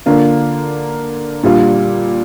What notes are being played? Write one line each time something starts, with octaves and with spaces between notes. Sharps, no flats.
D3 A#3 D4 F4
A#2 G3 D4 F4